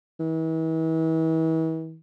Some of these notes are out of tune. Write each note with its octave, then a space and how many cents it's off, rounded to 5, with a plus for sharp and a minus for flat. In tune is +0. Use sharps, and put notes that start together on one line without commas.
E3 -40